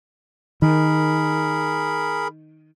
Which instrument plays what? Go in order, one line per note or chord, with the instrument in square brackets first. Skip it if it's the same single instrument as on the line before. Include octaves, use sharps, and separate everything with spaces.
[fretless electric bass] D#3 [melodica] G#4 A#4 B5